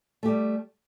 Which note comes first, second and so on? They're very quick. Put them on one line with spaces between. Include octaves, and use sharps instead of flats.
A3 G4 G3